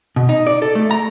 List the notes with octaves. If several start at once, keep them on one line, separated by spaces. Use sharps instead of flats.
B2
D#4
D5
A4
A3
A#5